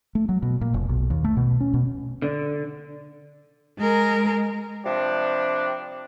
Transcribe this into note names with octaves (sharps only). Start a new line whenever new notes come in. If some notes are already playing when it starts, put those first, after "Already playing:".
A3
F#3
B2
A#2
F1
B1
D#2
A3
B2
C#4
B2
D3
G#3 A#4
C3 F3 G3 D4